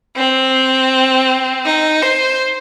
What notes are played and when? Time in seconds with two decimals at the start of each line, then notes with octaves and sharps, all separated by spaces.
0.16 C4
1.65 D#4
2.02 C5